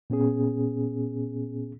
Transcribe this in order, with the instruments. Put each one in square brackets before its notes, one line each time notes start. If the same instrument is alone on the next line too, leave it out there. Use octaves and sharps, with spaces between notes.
[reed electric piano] A#2 B3 C#4 G#4